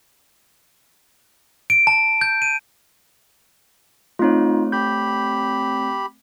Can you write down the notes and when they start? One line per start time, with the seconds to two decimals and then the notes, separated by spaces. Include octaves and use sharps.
1.70 D7
1.87 A5
2.21 G6
2.42 D#7
4.19 A3 C4 D#4 F4 C#5
4.72 G4 B5 G6